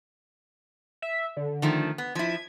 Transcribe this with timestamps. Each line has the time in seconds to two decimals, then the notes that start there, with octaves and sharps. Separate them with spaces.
1.02 E5
1.37 D3
1.62 D#3 F3 A3
1.98 B3
2.15 F3 E4 G#6